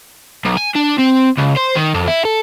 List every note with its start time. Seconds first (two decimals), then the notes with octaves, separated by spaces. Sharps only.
0.45 B1
0.57 G#5
0.75 D4
0.98 C4
1.37 C#2
1.57 C5
1.75 D#3
1.94 F2
2.08 E4
2.25 A4